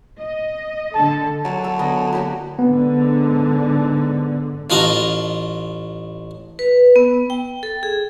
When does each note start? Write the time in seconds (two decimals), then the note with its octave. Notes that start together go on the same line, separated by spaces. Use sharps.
0.19 D#5
0.95 D3 A4 A5
1.45 F#3 D4 A4
1.64 A4
1.79 D3 B3 D#5
2.13 A#3 F#4 G4
2.59 G#2 D3 B3
4.70 A1 F4 F#4 D#5 A5 A#5
6.59 B4
6.96 B3
7.30 G5
7.63 A4
7.83 G#4